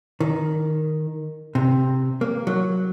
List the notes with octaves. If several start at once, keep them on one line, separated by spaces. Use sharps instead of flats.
D#3
C3
A#3
F#3